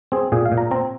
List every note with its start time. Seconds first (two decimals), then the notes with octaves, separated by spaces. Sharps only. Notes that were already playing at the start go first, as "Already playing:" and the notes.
0.12 C4 G#4
0.32 A#2 G#4
0.45 F5
0.52 A#2
0.58 A#5
0.71 C4 A#5